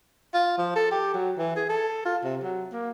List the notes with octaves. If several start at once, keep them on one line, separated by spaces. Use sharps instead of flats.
F4
F3
A4
G4
F#3
E3
G#4
A4
F4
C3
F#3
A#3